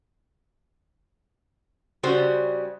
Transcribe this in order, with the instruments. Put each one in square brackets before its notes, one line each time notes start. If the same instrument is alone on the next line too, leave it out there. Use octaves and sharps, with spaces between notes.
[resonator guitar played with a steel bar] C#3 G3 F#4 C5